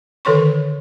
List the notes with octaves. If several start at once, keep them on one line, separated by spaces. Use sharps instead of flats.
D3 D#3 A4 C#5 C6 C#6